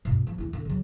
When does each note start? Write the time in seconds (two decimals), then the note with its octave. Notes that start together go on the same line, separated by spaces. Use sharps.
0.05 G2 B2
0.27 F3
0.38 E2 E4
0.53 D3
0.65 C#3 F#3